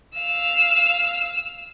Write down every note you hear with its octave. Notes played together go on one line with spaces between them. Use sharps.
F5 E6